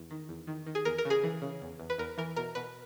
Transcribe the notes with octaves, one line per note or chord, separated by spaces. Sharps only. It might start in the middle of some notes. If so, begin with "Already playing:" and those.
Already playing: E2
D#3
E2
D#3
D#3
G#4
E2 A#4
A#4
C#3
G#4
E3
C#3
E2
E2
B4
E2 A#4
E3 A#4
B2 A#4
B2 B4